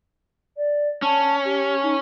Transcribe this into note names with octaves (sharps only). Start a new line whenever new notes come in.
D5
C#4 A5
G4
D#4